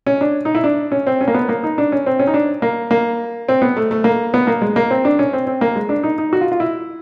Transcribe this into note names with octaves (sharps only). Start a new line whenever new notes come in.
C#4
D4
D#4
E4
D4
C#4
C4
C#4
A#3
B3
A#3
D#4
D4
C#4
C4
C#4
D#4
D4
A#3
A#3
C4
B3
A3
A3
A#3
B3
A#3
G#3
A#3
C4
D4
C#4
C4
C4
A#3
G#3
D4
D#4
D#4
F#4
F4
F4
E4